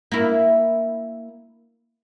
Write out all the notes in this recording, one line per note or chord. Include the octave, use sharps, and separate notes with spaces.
A#3 E4